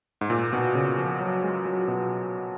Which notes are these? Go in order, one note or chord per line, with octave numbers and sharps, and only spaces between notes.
G#2
A#2
B2
C#3
F3
F#3
G#3
F#3
B2